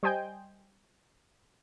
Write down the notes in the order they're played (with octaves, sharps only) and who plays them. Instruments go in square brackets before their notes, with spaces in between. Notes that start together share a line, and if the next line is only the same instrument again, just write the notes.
[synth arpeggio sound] G3 C5 D#5 G5 G#5 G6